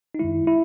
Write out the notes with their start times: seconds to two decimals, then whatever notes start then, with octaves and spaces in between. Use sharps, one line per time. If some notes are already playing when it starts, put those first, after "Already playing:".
0.15 D#4
0.19 F#2 D#3 G#3 E4
0.47 E4